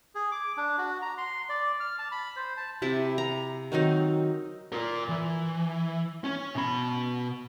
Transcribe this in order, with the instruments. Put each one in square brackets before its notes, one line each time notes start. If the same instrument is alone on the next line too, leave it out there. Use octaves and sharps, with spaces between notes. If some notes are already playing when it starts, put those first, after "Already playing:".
[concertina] G#4
D6
D4
F#4
A#5
C6
D5
F6
A5
B5
C5
A5
[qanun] C3 E4 A5
A#5
D#3 F#3 C4 D#4
[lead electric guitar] F4 A#4
E3
C#4
B2 B5